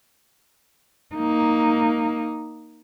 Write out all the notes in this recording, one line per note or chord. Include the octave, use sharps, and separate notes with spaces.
A#3 D#4